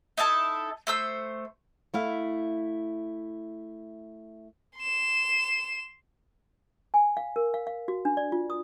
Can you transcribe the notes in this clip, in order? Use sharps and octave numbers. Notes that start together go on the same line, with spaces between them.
D#4 E4 A4 A5
A3 C5 E6
A3 E4 F5
C6 E7
G#5
F5
A#4
F5
F5
F#4
D4
D5
F4
D#6